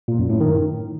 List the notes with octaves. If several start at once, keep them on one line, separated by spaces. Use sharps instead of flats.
A#2
F#2
A2
D#3